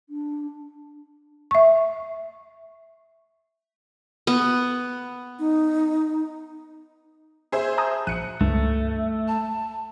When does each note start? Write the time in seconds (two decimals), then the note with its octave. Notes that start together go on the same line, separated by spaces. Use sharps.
0.09 D4
1.51 E5 C#6
4.27 B3
5.39 D#4
7.52 G#4 C5 E5
7.78 A5 A#5 D#6
8.07 A#1 F#6 C#7 D#7
8.41 C#2 G2 A3
9.28 A5